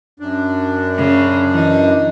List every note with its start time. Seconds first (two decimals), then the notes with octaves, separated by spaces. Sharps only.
0.20 F#2 D4
0.97 C#3
1.55 E3 D#4